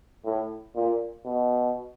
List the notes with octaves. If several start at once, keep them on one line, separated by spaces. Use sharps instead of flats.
A2
A#2
B2